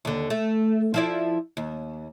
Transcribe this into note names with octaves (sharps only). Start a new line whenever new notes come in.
D#2 D3
A3
F3 E4 D5
D#2